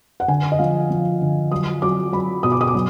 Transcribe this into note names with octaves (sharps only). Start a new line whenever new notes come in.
F#5
D3 G#5
D#5
F3 F5
F3
D3
F#3 D#6
F#3 D6
F#3 B5
B2 D#6
D6
D#6
D6
F#3